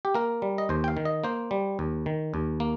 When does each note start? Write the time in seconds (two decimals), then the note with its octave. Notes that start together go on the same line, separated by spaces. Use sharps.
0.05 G4
0.14 A#3 A#4
0.42 G3
0.58 D#5
0.69 D#2 C5
0.84 G5
0.88 F5
0.97 D#3
1.05 D#5
1.24 A#3 C5
1.51 G3
1.79 D#2
2.06 D#3
2.34 D#2
2.60 A#3